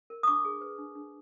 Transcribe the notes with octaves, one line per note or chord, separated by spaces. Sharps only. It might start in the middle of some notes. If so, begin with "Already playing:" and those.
A#4
D#6
D4 D6
G#4
B4
D4
D4